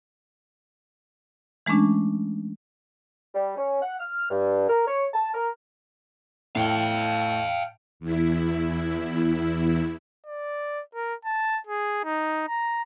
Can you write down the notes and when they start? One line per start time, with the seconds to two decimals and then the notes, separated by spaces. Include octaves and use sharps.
1.66 E3 G#3 A3 C#4 D4
3.34 G3
3.57 C#4
3.82 F#5
4.00 F6
4.30 G2
4.69 A#4
4.87 C#5
5.14 A5
5.34 A#4
6.55 A2 F5 G5
8.00 E2 E4
10.27 D5
10.95 A#4
11.26 A5
11.67 G#4
12.05 D#4
12.48 A#5